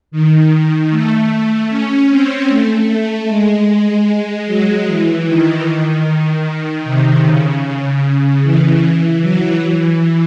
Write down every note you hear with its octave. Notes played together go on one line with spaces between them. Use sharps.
D#3
A3
C#4
C4
A3
A3
G#3
G#3
F#3
E3
D#3
C3
C#3
E3
F#3
E3